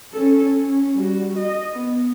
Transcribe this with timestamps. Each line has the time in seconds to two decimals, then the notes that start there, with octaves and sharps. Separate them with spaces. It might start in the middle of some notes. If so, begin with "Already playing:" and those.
0.12 C#4 A4
0.44 C#4
0.98 G3 F#4
1.37 D#5
1.73 B3